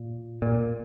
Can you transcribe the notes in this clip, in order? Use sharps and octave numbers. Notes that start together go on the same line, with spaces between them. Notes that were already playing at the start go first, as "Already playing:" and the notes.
Already playing: A#2
A#2